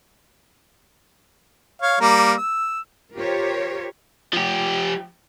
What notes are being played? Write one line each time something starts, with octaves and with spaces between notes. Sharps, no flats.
C#5 F5
G3 A#3 A#4
E6
F4 G4 A#4 C5 C#5
F3 G4